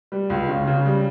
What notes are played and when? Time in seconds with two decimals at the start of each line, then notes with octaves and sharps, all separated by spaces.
0.12 G3
0.30 C#2
0.49 C#3
0.67 C#3
0.86 G3